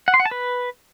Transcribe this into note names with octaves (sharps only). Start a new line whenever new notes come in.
F#5
C6
F#5
A5
B4